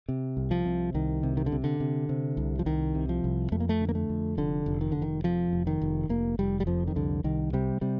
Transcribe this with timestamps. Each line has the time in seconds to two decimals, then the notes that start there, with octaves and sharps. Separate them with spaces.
0.09 C3
0.37 C2
0.51 F3
0.65 C3
0.94 C2 D#3
1.23 C3
1.37 D#3
1.46 D3
1.52 C3
1.64 D3
1.80 C3
2.09 C3
2.37 C2
2.59 F3
2.66 C2 D#3
2.95 C3
3.09 F3
3.24 C2
3.52 F2 A3
3.60 A#3
3.69 A3
3.81 D3
3.89 A#3
3.95 A3
4.09 F2
4.37 F1 D3
4.66 F1
4.81 D#3
4.92 F1 D3
5.02 D#3
5.24 F2 F3
5.53 F1
5.67 D#3
5.81 F1
6.09 F1 A#3
6.39 F1 G3
6.60 G3
6.67 F2 F3
6.88 D#3
6.96 C2 D3
7.24 C2 D#3
7.53 C3 G3
7.81 C3 G3